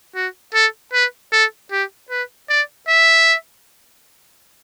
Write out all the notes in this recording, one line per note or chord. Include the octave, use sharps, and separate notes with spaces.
F#4
A4
B4
A4
G4
B4
D5
E5